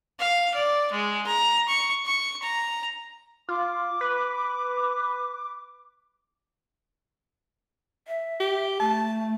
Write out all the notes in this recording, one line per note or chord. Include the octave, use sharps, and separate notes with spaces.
F5
D5
G#3
A#5
C#6
C#6
A#5
F4 D6
B4
E5
G4
A3 A5